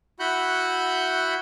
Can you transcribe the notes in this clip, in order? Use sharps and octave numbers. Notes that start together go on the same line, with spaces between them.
E4 F#4 F#5 B5 F#6 G6